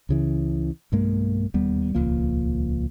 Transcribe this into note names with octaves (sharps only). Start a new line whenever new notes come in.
C#2 C#3 E3
B1 G2 G#3 A#3
E1 D#2 G3 B3
D#1 C#2 F3 A#3